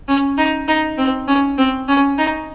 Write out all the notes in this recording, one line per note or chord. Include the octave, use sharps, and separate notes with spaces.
C#4
D#4
D#4
C4
C#4
C4
C#4
D#4